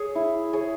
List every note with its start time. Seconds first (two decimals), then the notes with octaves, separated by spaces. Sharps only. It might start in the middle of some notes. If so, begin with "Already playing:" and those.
Already playing: G#4 C#5
0.15 E4
0.53 G#4 C#5